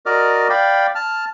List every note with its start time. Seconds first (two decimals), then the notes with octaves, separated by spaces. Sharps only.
0.06 F#4 A#4 D5 D#5 D6 F6
0.50 D5 F5 G5 B5
0.95 A5 F6